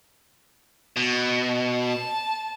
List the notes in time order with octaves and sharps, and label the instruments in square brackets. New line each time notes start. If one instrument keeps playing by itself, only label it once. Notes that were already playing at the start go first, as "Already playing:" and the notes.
[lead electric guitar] B2
[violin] A5